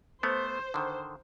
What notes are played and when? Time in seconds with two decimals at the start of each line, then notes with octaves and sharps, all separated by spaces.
0.23 A3 B3 C5
0.74 D3 D#3